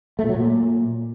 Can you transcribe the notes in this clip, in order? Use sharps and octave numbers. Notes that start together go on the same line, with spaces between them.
A3
A#2
F#3
A#2